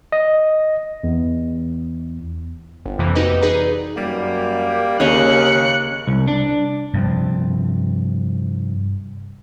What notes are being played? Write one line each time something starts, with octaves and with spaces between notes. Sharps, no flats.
D#5
E2
G1
F2 C3 E3 A#3
D#4 F#4 G4 B4 D#5
D#4 G#4 B4 D5 A#5
F#2 G3 A#3
D#2 C#3 A#3 C#4 D#5 F#6 C#7
C2
D4
G2 C3 F3